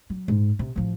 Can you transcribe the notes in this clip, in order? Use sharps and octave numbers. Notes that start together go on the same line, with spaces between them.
F#3
G#2
C3
A1 F3